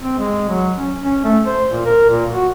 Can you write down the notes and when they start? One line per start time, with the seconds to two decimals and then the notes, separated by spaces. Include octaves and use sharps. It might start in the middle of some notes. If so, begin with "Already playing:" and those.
0.03 C4
0.19 G#3
0.49 F#3
0.77 C#4
1.04 C#4
1.24 A3
1.46 C5
1.71 A#2
1.86 A#4
2.10 A#2
2.34 F#4